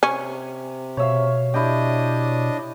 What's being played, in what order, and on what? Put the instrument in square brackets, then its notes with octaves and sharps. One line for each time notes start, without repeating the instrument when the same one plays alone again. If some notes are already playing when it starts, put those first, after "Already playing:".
[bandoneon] C3 [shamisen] C#4
[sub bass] B2 [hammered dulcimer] C#5 E5 F5
[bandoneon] D4 D#5 [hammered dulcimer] E4 G4